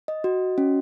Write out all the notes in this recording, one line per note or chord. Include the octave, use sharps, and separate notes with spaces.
D#5
F#4
C#4